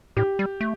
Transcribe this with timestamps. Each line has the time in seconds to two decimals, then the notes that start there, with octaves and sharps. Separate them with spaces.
0.16 A2 G4
0.39 G3
0.61 A3